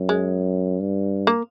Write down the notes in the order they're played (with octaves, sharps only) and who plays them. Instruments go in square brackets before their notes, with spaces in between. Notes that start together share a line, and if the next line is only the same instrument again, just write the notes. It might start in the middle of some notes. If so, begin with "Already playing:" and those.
Already playing: [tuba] F#2
[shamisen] G#3
[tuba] G2
[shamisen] A#3